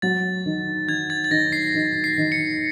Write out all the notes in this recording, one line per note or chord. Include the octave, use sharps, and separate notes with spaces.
F#3 A6
D#3
D#3 G#6
A6
A6
D#3 A#6
C7
D#3
C7
D#3
C#7